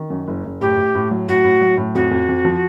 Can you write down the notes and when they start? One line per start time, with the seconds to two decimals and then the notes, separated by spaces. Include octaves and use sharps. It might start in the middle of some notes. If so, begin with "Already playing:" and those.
Already playing: D#3
0.10 F#2
0.28 F#1
0.45 F#1
0.61 A2 G4
0.77 A2
0.95 A2
1.11 F#3
1.28 A2 F#4
1.44 A2
1.61 F#3
1.77 A2
1.95 F2 F#4
2.11 F2
2.29 F2
2.45 F3